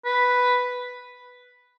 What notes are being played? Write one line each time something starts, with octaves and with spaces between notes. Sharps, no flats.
B4